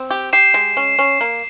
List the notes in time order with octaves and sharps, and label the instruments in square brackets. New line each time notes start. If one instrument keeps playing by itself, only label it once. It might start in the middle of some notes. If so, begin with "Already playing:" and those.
Already playing: [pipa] C4
G4
[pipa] G4 [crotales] C7 E7
[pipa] G#3
C#4
C#4
A#3